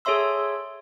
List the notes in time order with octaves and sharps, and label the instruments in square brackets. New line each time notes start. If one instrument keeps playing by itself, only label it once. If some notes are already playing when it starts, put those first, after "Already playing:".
[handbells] G#4 A4 C#5 E5 C6 E6